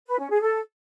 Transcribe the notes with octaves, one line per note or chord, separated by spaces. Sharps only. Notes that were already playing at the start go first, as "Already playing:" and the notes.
B4
C#4
G#4
A4